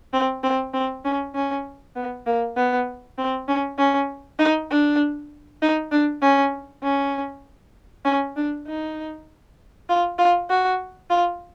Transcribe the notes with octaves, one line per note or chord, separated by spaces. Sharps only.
C4
C4
C4
C#4
C#4
B3
A#3
B3
C4
C#4
C#4
D#4
D4
D#4
D4
C#4
C#4
C#4
D4
D#4
F4
F4
F#4
F4